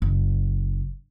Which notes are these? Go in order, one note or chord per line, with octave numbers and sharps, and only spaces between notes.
F#1